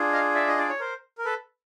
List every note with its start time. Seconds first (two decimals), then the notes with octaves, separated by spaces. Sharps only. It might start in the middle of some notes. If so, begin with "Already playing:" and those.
Already playing: D4 F4 G#4
0.12 D#5 F5
0.35 D5 E5
0.47 D#5
0.58 D5
0.69 C#5
0.80 A#4 C5
1.18 A#4
1.25 A4 B4